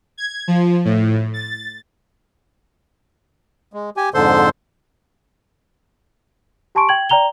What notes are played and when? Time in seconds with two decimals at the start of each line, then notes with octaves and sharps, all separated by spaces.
0.18 G#6
0.48 F3
0.85 A2
1.34 A6
3.73 G#3
3.97 G4 G#5
4.14 F2 G#2 D3 A4 C5 C6
6.75 G4 G#5 A5 C6 C#6 D7
6.89 G5 G#6 F#7
7.09 D5 G5 A#5 F7 G7